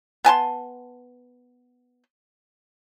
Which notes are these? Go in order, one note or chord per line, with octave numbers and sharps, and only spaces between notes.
B3 G#5 A5 C6